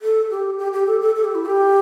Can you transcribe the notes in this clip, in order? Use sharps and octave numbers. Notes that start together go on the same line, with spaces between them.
A4
G4
G4
G4
A4
A4
A4
G4
E4
G4